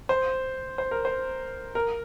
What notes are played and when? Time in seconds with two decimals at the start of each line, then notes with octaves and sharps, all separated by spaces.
0.09 C5
0.78 C5
0.91 A#4
1.05 C5
1.75 A#4